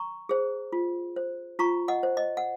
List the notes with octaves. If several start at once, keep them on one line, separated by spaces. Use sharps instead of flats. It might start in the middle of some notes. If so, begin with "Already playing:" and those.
Already playing: A#5 C#6
G#4 C5
F4
C5
F4 A#5 C#6
D#5 F#5
C5
D#5
F#5